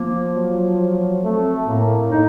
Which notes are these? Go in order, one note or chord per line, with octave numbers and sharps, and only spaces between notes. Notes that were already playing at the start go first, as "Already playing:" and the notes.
Already playing: F3 A#3
F#3
F#3
A3 C4
A2 A#3
D#4